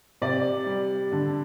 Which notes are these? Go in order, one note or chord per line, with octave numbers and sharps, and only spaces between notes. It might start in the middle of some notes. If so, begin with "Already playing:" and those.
C3 D5
G3
D3